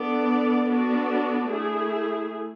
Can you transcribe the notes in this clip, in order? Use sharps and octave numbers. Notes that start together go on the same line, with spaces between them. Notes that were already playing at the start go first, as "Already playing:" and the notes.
Already playing: B3 D4 A4 D5
B3 D4 F#4 A4 D5
A3 E4 G#4